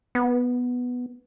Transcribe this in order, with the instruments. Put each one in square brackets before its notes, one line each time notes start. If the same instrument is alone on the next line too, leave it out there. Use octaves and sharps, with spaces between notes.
[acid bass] B3